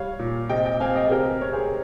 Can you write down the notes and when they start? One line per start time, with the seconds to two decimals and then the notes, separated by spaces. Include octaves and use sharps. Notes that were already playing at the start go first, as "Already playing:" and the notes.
Already playing: G3 C#5 F5
0.19 A#2
0.49 C3 D#5 G5
0.65 D#5 G5
0.80 C4 F5 G#5
0.96 D#5 G5
1.06 G#4
1.11 C3 G4 A#4
1.41 C4 C#5
1.53 G#4 C5